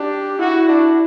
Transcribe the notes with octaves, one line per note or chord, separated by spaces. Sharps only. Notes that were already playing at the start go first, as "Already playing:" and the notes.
Already playing: D4 G4
E4 F#4
D4